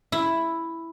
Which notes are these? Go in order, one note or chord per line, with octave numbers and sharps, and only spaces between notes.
E4